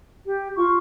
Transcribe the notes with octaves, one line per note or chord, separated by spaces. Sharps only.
G4
F4 C#6